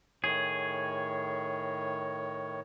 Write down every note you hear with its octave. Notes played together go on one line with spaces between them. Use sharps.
A2 D#3 G#4 C#5